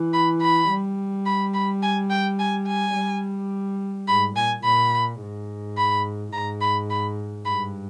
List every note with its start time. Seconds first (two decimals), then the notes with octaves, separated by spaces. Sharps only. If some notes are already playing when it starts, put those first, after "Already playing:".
Already playing: E3
0.13 B5
0.42 B5
0.70 G3
1.26 B5
1.54 B5
1.83 G#5
2.10 G5
2.39 G#5
2.67 G#5
2.96 G3
4.08 G#2 B5
4.36 A#2 G#5
4.64 A#2 B5
5.21 G#2
5.78 B5
6.33 G#2 A#5
6.61 B5
6.90 B5
7.45 G2 B5